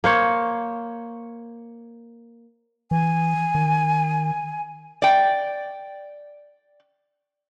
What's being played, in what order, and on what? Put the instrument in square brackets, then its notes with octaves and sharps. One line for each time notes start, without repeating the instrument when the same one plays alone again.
[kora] A#3 C5 C#5
[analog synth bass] E3 [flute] G#5
[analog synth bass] D#3
[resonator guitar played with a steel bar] D5 G5